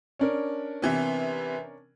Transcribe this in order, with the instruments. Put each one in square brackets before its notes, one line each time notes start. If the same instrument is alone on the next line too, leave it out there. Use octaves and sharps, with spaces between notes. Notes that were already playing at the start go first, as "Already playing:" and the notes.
[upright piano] C#4 D4 A#4
[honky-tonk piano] C3 E3 B3